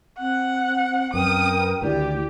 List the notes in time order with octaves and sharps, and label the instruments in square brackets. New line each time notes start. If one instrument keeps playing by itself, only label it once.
[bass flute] C4 [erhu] F#5 [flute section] F#6
[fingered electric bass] F#2 [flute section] A#4 B4 G5 [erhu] D#6
[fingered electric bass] D2 D#3 [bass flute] E4 [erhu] G4 [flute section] D5